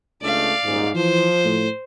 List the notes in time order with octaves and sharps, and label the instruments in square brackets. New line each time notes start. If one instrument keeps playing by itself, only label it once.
[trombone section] C#2 A3 D4 [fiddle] D5 F5
[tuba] D#1 [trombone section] G#2
[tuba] E3 [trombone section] F3 [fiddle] C5
[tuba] A2